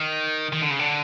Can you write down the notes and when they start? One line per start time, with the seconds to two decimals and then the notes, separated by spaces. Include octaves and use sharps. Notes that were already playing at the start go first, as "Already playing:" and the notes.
Already playing: D#3
0.53 D#3
0.62 D3
0.70 C#3
0.79 D3